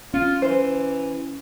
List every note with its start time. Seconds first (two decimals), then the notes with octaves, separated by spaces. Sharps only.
0.14 C#4 F4
0.42 E3 C5